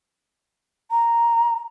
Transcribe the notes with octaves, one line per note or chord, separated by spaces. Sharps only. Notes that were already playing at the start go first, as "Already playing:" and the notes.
A#5